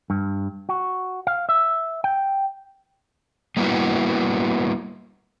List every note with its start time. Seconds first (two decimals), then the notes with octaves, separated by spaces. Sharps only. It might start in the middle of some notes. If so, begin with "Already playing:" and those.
0.10 G2
0.69 F#4
1.27 F5
1.49 E5
2.04 G5
3.57 G3 A#3 B3 E4 F#4